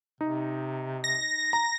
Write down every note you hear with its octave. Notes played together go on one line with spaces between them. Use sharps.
C3 D#4
A#6
A#5